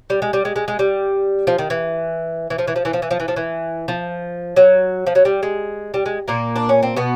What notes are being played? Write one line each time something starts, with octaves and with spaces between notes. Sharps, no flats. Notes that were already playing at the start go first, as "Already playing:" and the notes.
G3
G#3
G3
G#3
G#3
G#3
G3
F3
D#3
E3
E3
F3
E3
F3
E3
F3
E3
F3
E3
F3
E3
F3
F#3
F3
F#3
G3
G#3
G3
G#3
A#2 A#3
D4
C#4
C4
B2 B3